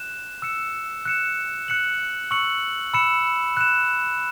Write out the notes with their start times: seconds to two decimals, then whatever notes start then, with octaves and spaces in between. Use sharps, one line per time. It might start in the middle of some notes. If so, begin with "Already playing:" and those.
Already playing: F#6 E7
0.42 E6 C#7 E7
1.05 F#6 C#7 E7
1.68 F#6 C#7 F#7
2.31 C#6 E6 C#7 F#7
2.94 B5 E6 C#7 E7
3.57 F#6 E7